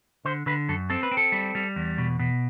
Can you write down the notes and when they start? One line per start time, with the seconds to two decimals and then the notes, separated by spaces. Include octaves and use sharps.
0.25 D3 C5
0.46 D3 B4
0.69 F#2 A4
0.90 C4 A4
1.03 B4
1.11 C4
1.17 A4
1.32 G3
1.55 G3
1.76 E2
1.98 B2
2.19 B2